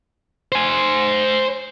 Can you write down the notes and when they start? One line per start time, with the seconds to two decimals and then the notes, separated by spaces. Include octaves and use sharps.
0.52 C5 G#5